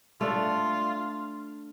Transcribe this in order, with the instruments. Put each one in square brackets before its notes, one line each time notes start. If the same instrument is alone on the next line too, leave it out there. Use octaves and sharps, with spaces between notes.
[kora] A3 D4 [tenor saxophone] F4